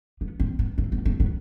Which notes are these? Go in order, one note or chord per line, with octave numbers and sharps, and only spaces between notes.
B3
C4
B3
C4
B3
C4
B3